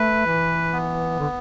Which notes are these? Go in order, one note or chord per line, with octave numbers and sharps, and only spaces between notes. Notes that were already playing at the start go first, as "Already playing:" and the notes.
Already playing: A3 B4
E3
B3
D3